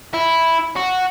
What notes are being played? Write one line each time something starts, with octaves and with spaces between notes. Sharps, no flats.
E4
F#4